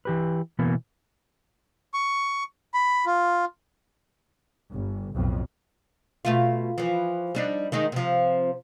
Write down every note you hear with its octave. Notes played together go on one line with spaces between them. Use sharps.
E3 G4 B4
B2 E3 A#3 B3
C#6
B5
F4
G1
B1 F2 A2
B2 A3 F4
E3 F3
G3 D4 D#4
D#3 G#3 D#4
C3 F3